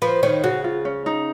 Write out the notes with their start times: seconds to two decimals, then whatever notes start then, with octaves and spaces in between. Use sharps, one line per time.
0.02 F3 B4
0.23 D#3 C#5
0.43 C#3 F#4
0.64 F4
0.85 C#4
1.06 D#4